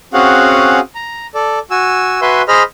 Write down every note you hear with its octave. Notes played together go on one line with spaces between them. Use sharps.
C4 C#4 F#4 G#4 F5 F#5
A#5
A4 D5
F#4 G#5 E6
F#4 B4 E5 G#5 C6
G#4 C5 D#5 B5 F6